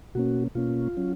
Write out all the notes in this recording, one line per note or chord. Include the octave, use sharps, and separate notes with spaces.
B2 A#3 C#4 F#4
B2 A#3 C#4 F4
F#3 C#4